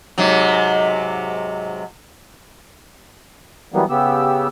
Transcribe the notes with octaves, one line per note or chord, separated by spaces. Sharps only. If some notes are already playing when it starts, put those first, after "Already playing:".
G#2 C3 F#3
E3 F#3 G3 A#3 B3
C#3 B3 G4 E6